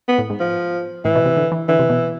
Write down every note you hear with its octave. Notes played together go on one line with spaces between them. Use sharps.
B3
A2
G#2
F3
A2 E3
B2
C3
D3
E3
D3 E3
C3
B2